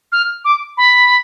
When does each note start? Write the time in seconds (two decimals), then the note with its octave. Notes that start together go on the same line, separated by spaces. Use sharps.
0.12 F6
0.45 D6
0.77 B5